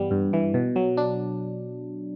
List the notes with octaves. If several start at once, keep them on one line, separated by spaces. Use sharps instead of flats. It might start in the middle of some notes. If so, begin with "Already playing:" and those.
Already playing: G2 E3 G3 B3
G2
E3
B2
F#3
D4